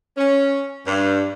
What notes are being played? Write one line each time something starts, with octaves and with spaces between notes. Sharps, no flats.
C#4
G2